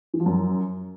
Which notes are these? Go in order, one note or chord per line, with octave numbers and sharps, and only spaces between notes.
E3
F3
F#2